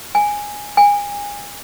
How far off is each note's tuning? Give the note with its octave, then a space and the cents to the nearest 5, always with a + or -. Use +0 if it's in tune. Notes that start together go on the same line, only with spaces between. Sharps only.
G#5 -5
G#5 -25